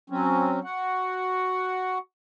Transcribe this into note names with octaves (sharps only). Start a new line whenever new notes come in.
F#3 C4 C#4
F#4 F#5